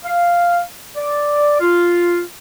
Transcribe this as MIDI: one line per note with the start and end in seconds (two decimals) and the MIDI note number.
0.04 0.60 77
0.96 1.59 74
1.60 2.20 65